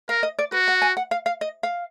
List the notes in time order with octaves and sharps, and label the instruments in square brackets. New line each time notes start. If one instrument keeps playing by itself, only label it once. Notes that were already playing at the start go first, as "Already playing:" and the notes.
[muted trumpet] A#4 [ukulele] F5
[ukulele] D#5
D5
[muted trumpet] F#4 [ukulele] B4
[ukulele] F#5
G#5
F#5
F5
F5
D#5
F5